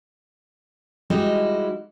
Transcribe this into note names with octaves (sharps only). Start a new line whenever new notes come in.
G3 G#3 D#4 E4 F#4